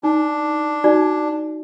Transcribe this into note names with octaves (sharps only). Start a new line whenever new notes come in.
D4 D#4
D#4 F#4 D5